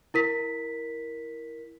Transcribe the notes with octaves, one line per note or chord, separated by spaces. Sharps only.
E4 A#4 B6